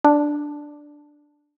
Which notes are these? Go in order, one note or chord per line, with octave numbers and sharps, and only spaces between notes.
D4